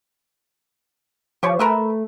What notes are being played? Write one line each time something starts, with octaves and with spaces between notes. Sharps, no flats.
F3 G4 C#5
A3 A#4 B4 E5